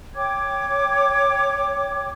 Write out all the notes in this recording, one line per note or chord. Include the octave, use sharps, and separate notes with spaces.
C#5 G5 D6 G#6